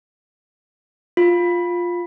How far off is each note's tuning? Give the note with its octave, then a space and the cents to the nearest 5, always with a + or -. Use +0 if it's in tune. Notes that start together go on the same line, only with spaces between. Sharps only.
F4 +10